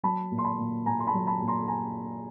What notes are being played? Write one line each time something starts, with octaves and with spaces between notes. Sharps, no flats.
F#3 A5 B5
A#2
C6
A5 B5
A#2
A#2 G#5 A#5
C6
A5 B5
F#3
A5 B5
A#2
A#5 C6
G#5 A#5